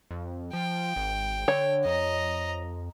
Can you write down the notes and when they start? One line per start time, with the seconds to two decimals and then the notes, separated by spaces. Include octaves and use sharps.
0.11 F2
0.53 F3 G5
0.96 G#1
1.48 D3 C#5
1.85 F2 D#5 A#5